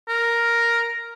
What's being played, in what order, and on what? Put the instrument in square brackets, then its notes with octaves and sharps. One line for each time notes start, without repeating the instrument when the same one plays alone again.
[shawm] A#4